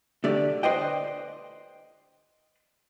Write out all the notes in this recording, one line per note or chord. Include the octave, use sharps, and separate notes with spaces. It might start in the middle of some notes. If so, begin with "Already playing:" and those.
D3 A3 G4 D5
B4 C5 D5 D#5 G5